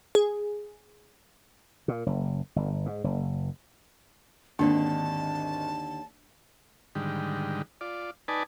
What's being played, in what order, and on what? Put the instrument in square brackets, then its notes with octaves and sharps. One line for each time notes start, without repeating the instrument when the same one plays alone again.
[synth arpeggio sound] G#4
[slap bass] A#2
F#1
G1
G#2
F#1
[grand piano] G#1 [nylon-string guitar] D#2 D3 [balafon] D4 [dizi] A5
[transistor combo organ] G#2 D3 D#3 G3
F4 D5
D#4 B4 D5 G#5 A5